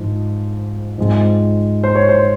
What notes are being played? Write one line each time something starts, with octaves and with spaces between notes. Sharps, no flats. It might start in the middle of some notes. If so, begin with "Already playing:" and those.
Already playing: G#2 F3
G#2 F3 G#3 C4
C5
C#5
C5